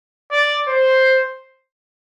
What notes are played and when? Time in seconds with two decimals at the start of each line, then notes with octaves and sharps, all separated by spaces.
0.32 D5
0.68 C5